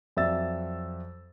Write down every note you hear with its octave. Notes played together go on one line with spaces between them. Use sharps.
F2 F#3 D5 E5 E6 A6